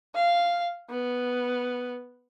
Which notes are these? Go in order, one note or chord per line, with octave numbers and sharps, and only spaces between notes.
F5
B3